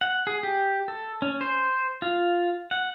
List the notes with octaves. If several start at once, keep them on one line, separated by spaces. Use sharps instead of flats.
F#5
G#4
G4
A4
C#4
C5
F4
F#5